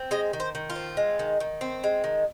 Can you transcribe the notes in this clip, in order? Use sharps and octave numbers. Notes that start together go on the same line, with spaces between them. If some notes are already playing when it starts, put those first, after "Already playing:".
Already playing: C4
G#3 D#5
D#3
C5
D#3
F4
C4
G#3
D#3
D#3
C4
G#3
D#3